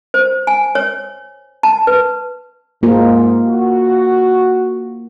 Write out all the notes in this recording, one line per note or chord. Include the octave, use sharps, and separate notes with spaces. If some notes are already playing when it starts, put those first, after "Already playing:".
C5
G#5
C#5
A5
B4
G#2 A#3 F4 A#4
F#4